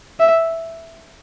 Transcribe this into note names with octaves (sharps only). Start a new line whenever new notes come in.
E5